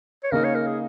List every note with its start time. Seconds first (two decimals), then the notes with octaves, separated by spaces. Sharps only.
0.23 C#5
0.31 C#3 A#3 D#4 A#4
0.44 C#5
0.55 A#4
0.67 G#4